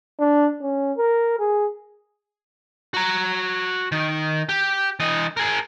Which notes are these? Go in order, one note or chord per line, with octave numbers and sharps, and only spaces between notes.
D4
C#4
A#4
G#4
F#4 A#5
D#3
G4
E3 D#5
G#4 A#4